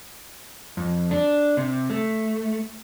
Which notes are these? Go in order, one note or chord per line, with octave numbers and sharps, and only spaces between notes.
F2
D4
C3
A3